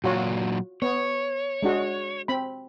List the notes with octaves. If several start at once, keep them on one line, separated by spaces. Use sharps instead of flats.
A#2 F#3 F4 F#4 C#5
B3 C#5
G#3 D4 F#4
C4 B5